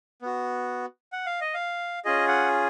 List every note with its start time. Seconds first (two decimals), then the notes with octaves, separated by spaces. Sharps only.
0.22 B3 F#4
1.12 F#5
1.26 F5
1.41 D#5
1.54 F5
2.05 C#4 F4 G#4 D#5
2.28 F#5